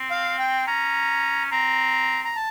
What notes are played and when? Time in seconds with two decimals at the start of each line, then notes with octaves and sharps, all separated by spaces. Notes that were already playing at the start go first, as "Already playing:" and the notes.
Already playing: C4
0.11 F5
0.39 G5
0.67 C#4 A#5
1.51 C4 A#5
2.25 A#5
2.36 A5